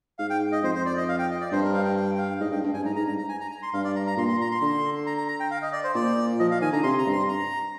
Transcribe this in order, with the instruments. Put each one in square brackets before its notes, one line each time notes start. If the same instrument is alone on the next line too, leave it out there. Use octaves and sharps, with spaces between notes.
[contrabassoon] G#2 [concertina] F5
[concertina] G5
D#5
[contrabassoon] F2 [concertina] C5
[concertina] C5
D5
D#5
F5
G5
D#5
D5
[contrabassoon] G2 [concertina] C5
[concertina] A#4
F5
G5
G5
G5
F5
[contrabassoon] G#2 [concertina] D#5
[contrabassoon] G2 [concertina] G5
[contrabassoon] G2
[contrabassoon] G2 [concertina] G#5
[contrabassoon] G#2 [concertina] A#5
[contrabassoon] G#2 [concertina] A#5
[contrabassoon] G2 [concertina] A#5
[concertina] A#5
G#5
A#5
A#5
C6
[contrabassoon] G2 [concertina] F5
[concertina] D5
A#5
A#5
[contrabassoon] A#2 [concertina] C6
[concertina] C6
A#5
C6
[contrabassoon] D3
[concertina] A#5
A#5
A#5
G5
F5
D#5
D5
C5
[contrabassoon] A#2 [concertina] D5
[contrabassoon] F3 [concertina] D#5
[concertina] F5
[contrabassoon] D#3 [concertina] G#5
[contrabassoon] D3 [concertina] A#5
[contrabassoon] C3 [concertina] C6
[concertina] A#5
[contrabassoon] G2
[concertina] C6
A#5